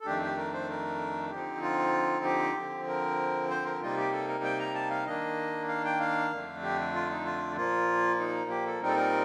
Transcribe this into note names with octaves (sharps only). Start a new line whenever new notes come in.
A4
F2 D#3 A3 D4 G4
G4
A#4
C5
A#4
D3 F3 C4 D#4 G4
F4
G4
D3 F3 C4
A#4
C5
A#4
C3 G3 A#3 D#4 F4
G4
A4
A#4
G5
A#5
A5
F5
D#3 A#3 D4 D#5
F5
G5
F5
F2 D3 A3 D4
G4
F4
D#4
F4
A#2 F3 A#3 F4
D#4
G4
A4
A#2 G3 C4 D#4 A#4
A4
A#4